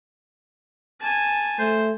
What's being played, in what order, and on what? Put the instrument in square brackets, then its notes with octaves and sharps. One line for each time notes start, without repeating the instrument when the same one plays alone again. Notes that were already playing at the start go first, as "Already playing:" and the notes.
[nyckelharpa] G#5 A5
[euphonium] A3 [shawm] C5